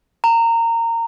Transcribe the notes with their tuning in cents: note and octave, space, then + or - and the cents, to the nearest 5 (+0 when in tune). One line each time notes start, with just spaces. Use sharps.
A#5 -20